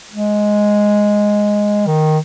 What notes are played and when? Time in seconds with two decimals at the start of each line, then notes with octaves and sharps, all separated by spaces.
0.12 G#3
1.87 D#3